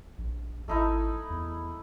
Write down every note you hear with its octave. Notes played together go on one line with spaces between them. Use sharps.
A#1
G#1 A3 D#4 E4
E2